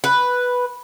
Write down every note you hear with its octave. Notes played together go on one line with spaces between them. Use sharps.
B4